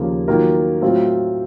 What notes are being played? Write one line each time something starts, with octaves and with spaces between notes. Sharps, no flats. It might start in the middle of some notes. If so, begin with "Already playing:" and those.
Already playing: D#2 C#3 F3 A#3
D#3 F#3 A#3 F4 A#4
A2 F#3 C4 F4